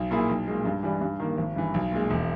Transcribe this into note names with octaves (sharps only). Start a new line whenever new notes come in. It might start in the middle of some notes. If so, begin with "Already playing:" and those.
Already playing: B1
A#2 A#3 E4 G#4
B1
A#2 G#3
G2
E3 G3
G2
D#3 A#3
G#1
G2 E3
B1
A#2 G#3
E1